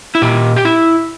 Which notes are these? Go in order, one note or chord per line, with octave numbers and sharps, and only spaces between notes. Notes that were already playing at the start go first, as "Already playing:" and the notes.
E4
A#2 G4
G4
E4